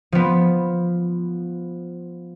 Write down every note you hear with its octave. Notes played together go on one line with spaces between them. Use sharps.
F3 B3